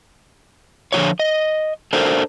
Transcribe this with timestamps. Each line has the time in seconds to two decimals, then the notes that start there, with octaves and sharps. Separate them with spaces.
0.92 D3 F3 F4 C#5
1.20 D#5
1.93 D4 A4 A#4 C5